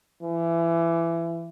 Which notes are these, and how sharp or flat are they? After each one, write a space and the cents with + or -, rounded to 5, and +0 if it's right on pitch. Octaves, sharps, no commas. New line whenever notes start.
E3 +25